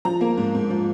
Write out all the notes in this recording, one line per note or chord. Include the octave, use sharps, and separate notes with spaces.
F3 A#5
A#3
G#2
G#2
F3